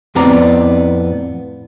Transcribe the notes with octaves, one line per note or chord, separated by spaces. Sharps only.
F2 A2 B3 C4 D5 A#5